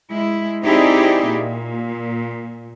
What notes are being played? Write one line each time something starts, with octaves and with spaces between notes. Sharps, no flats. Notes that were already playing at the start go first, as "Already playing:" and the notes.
G#3 E4
C4 D#4 E4 G4 G#4 D5
A#2